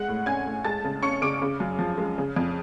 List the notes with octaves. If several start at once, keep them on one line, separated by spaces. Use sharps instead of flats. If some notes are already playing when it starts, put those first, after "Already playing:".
Already playing: G#3 F#5 F#6
A2
C#4 G#5 G#6
A2
G#3 A5 A6
C#3
C#4 C#6 C#7
C#3 D6 D7
C#3
F#2
F3
G#3
C#3
F2